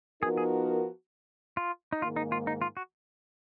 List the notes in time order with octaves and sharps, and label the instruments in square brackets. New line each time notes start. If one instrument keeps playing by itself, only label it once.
[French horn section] F3 B3 D#4 F#4 A#4 [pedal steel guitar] G#4
[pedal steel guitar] G#4
F4
D#4
[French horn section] G#2 D#3 A#3 [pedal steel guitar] F4
[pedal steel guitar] D#4
F4
D#4
F4
F#4